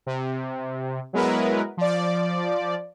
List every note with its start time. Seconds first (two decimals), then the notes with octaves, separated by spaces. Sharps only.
0.06 C3
1.13 F#3 G#3 B3 E4 A#4 B4
1.77 F3 D5